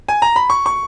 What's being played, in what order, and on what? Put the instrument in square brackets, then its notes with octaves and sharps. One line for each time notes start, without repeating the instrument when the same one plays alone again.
[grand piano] G#5
A#5
B5
C#6
C#6